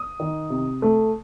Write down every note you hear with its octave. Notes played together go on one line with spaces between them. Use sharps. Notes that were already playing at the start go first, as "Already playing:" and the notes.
Already playing: D#6
D#3
C3
A3